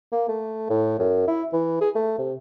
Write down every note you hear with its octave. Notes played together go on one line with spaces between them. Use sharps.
A#3
A3
A2
F#2
E4
E3
G#4
A3
C3